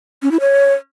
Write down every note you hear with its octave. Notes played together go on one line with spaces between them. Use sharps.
C#4
E4
C#5